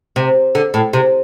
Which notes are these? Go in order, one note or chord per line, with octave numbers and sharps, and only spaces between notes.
C3
D3
A2
C3